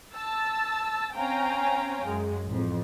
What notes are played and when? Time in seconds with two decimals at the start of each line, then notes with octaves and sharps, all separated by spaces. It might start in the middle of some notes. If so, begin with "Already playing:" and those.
0.13 A5 E6 A6
1.17 C4 C#4 F5 G5 G#5 A#5
2.05 F#2 G#3
2.48 A1 F2